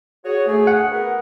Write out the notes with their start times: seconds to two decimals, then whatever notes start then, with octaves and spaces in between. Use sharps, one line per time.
0.25 F#4 G#4 C#5
0.47 D2 A3 G#4
0.67 F#5
0.91 B3 G#4 A#4